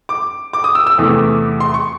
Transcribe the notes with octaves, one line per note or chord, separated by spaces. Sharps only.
D6
D6
D#6
E6
E6
E2 C3 E3 A3
C6
C#6